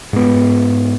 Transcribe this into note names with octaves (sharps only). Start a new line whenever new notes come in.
G#2 B3